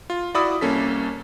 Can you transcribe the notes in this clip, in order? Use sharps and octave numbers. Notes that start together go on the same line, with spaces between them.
F4
E4 F#4 D5 B5 D#6 E6
C2 A#3 C#4 A4 B6